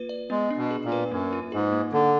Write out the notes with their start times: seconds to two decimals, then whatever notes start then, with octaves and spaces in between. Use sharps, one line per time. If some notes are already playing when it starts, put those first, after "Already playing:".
Already playing: A#3 F4 B4
0.09 D5
0.30 G#3 B3
0.50 D4
0.57 B2
0.71 G#4
0.85 A#2
0.92 B4
1.11 F#2 A#3
1.33 F4
1.52 G#2 G#4
1.72 A#3
1.93 D3 A#3